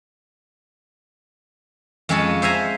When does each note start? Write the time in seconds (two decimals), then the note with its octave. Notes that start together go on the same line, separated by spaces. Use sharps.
2.09 F2 G#3 C#4 C#5 D#5 A5
2.42 C5 E5 F5 G#5 A#5